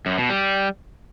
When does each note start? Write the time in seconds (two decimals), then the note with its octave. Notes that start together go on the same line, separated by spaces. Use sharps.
0.06 F#2
0.18 B2
0.30 G3